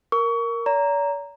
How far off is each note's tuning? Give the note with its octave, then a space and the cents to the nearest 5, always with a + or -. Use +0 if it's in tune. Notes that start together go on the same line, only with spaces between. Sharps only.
A#4 +0 C#6 +30
D5 -45 A#5 +0